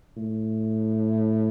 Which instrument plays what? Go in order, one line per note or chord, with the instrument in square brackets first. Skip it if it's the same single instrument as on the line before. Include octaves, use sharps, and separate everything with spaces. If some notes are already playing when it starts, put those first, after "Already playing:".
[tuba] A2